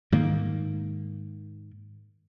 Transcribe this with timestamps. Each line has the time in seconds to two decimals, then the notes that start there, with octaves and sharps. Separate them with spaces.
0.12 G#2 D#3 A#3